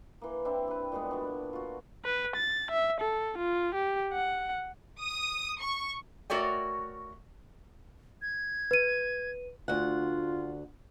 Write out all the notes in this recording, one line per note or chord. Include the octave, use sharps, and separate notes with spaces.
E3 A#3
C4 D4 E4
G4 B4
A#2 G3 G#3 B3
D4 F#4
F4 F#4
B4
A6
E5
A4
F4
G4
F#5
D#6
C#6
A3 F#4 A#4 C#5 D5 G5
G#6
B4 D#7
D2 F4 F#5